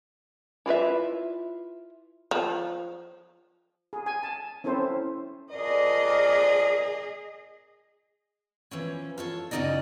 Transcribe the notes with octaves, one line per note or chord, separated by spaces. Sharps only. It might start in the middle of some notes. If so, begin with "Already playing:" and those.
E4 F4 B4 E5
F3
G#4
G#5
A5
C4 C#4 E4 A4 C5
F2 G#4 A#4 D5 D#5
E3 F3 C#4
F4 A4 C#5
F#2 C#3 C#4 D#4 D5 D#5